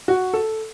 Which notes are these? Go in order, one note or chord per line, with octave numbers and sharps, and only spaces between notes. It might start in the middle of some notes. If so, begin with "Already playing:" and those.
F#4
A4